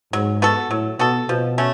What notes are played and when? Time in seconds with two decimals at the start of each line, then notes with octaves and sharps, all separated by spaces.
0.13 G#2 F#3
0.42 B3 F#4 A4
0.70 A2 F#3
0.99 B2 B3 F#4 A4
1.29 B2 F3
1.58 A3 C#4